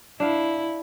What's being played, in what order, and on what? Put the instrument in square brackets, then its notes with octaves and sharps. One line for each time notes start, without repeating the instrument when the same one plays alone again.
[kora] D4 F5 [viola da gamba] E4